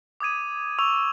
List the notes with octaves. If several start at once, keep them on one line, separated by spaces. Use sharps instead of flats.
D6 D#6 G#6 D#7
C#6 E6 F7